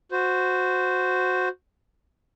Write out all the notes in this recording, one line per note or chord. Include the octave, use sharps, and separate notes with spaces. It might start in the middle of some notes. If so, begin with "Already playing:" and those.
F#4 C5